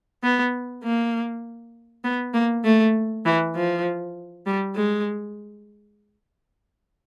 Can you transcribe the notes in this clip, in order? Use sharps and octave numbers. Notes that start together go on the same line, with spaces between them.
B3
A#3
B3
A#3
A3
E3
F3
G3
G#3